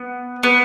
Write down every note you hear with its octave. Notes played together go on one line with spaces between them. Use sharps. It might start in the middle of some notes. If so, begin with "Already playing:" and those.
Already playing: B3
B3